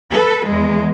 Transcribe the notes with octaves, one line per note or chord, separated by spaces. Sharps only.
A4 B4
E2 G#3